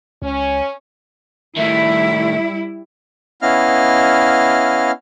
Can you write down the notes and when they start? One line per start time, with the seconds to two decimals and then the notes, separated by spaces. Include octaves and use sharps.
0.22 C#2 C#4
1.57 A2 D#3 G3 E4 E5
3.42 B3 C#4 E4 D#5 F5 F6